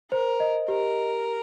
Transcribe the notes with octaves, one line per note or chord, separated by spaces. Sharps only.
A#4 C5
D#5
G4 A#4